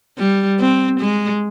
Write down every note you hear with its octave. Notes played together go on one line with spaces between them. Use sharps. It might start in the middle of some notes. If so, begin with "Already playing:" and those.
G3
C4
G#3